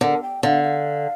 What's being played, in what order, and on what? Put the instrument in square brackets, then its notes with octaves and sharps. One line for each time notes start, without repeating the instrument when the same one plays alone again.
[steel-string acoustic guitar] D3 [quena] A#4
[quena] G5
[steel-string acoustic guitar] D3 [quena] F5
[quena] F5